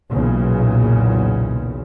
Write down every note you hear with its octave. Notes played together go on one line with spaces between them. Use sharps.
B1 E2 A#2 C#3